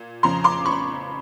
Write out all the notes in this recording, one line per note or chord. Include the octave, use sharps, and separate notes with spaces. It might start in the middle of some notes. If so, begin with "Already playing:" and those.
Already playing: A#2
F2 C#3 F3 A#5 C6
C6 D6
B5 C#6